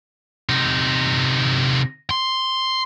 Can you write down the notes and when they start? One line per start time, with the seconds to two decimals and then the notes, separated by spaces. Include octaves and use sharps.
0.49 C3 D#4
2.10 C6